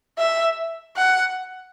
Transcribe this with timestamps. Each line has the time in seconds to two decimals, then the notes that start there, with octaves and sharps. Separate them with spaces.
0.19 E5
0.97 F#5